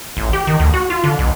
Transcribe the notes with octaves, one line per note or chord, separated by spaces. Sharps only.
A1
G4
D#3
D2
F#4
F4
D3
B1